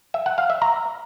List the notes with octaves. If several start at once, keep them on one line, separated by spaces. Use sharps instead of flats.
E5
F#5
F5
E5
A#5